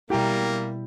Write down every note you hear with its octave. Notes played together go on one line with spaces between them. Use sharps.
B2 G3 A#3 E4 G4 G5 A#5